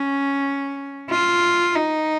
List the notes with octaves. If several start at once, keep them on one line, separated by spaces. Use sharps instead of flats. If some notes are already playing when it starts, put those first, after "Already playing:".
Already playing: C#4
F4
D#4